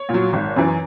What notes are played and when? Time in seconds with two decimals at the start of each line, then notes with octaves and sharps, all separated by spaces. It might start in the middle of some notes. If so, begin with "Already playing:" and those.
Already playing: C#5
0.09 A#2
0.14 F#3
0.33 G#1
0.56 F#2 E3